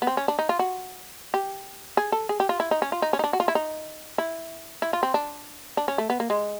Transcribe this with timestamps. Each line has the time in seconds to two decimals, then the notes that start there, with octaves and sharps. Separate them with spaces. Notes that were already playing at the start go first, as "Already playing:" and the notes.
0.02 B3
0.07 C4
0.17 C#4
0.28 D4
0.39 D#4
0.49 F4
0.59 F#4
1.34 G4
1.97 G#4
2.12 A4
2.29 G#4
2.40 G4
2.49 F4
2.60 E4
2.71 D#4
2.82 C#4
2.92 F4
3.02 D#4
3.13 C#4
3.19 D#4
3.24 D4
3.33 F#4
3.40 F4
3.48 E4
3.55 D#4
4.18 E4
4.82 E4
4.93 F4
5.03 C4
5.14 D4
5.77 D4
5.88 C#4
5.98 A3
6.10 B3
6.20 A#3
6.30 G#3